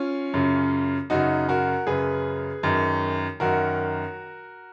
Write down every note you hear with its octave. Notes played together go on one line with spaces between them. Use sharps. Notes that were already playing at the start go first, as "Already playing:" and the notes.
Already playing: C#4 F4
F#2 C#3
F#2 C#3 D#4 F#4
F#4 A#4
F#2 C#3 G#4 B4
F#2 D#3
F#2 D#3 F#4 A#4